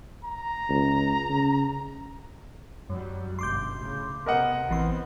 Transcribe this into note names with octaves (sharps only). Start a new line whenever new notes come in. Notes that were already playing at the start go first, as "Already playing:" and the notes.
A#5
C#2
C#3
F#2 F#3 G3
G1 C#2 B2 C6 D6 G6
A2 C#3
C3 B3 A#4 D#5 F#5
A1 E3 B3 C4 C6